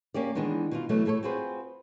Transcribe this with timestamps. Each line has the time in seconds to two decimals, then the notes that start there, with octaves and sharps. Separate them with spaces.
0.14 A#3 C#4 G4 D5
0.35 D#3 E3 G#3 B3 D4 D#4
0.71 B2 D#4 F4
0.89 B2 E3 F#3 A3
1.05 A3 E4 A4 C5 C#5
1.23 C4 F4 F#4 G#4 B4 C5